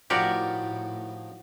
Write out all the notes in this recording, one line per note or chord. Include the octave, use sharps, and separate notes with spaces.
A2 D#3 F3 F#4 G4 A#4 D5